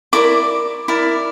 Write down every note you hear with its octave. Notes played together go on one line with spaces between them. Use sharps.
E4 A#4 D5 D6
E4 A#4 D5